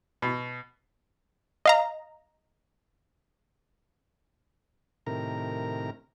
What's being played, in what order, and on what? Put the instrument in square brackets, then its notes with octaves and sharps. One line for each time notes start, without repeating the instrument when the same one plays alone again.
[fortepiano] B2
[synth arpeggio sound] D#5 F5 A#5
[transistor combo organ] A2 C3 D#3 A#4 A#5